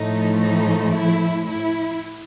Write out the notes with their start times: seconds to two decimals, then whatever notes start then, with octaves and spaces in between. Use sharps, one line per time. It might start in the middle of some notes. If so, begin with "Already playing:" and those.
Already playing: A2 F3 A3 D#4
0.39 D#4
0.93 E4
1.47 E4